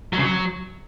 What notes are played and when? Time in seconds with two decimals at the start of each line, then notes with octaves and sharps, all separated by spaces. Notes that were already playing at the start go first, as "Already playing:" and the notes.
0.13 F#3
0.18 C#3
0.23 F#3